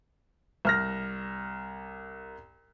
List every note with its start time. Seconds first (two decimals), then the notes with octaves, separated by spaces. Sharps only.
0.65 C2 F6 A#6